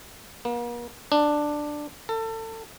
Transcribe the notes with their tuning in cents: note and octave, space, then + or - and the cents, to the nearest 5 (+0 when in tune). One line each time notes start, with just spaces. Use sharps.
A#3 +45
D4 +10
A4 +30